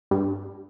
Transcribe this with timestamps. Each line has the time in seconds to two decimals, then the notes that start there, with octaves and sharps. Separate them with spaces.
0.11 G2